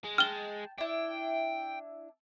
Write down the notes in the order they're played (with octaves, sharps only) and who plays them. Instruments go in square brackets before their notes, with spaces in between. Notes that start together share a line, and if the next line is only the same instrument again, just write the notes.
[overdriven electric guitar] G#3
[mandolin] G5 A5 [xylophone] F6 G7
[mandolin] D4 E4 [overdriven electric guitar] G5